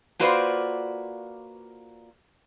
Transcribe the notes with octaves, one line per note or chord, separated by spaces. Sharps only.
A#3 F4 F#4 B4 C5 D5